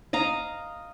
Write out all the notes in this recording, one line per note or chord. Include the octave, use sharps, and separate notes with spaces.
D#5 F5 A#5